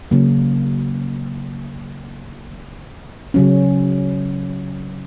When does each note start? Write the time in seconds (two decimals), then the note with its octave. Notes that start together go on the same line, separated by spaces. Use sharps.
0.11 C#3 F#3 A#3
3.34 C#3 F#3 C#4